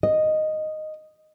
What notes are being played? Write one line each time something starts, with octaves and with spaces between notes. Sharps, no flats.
D#5